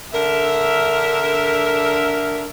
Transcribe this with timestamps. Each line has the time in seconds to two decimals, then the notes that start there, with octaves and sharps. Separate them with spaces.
0.13 D3 A#4 E5